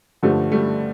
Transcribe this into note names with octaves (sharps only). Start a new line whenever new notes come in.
G2 D3 F3 G3 A3
G3 A3